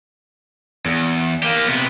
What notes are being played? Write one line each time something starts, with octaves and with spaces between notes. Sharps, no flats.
E2
A#3 G4
C3 B3